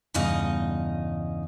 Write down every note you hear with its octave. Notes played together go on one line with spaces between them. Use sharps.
E2 G2 C#3 D#4 D#5